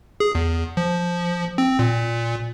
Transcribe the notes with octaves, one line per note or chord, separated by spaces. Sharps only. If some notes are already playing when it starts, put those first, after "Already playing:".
G#4
E2
F3
C4
A#2